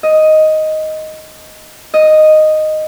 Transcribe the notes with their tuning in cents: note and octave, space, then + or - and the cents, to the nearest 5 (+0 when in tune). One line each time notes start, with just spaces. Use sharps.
D#5 +5
D#5 -5